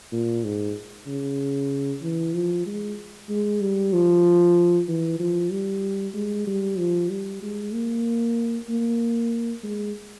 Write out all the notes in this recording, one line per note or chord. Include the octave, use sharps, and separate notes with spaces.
A#2
G#2
C#3
E3
F3
G#3
G#3
G3
F3
E3
F3
G3
G#3
G3
F3
G3
G#3
A#3
A#3
G#3